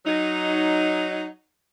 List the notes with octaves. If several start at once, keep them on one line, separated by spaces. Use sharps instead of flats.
F#3 D#4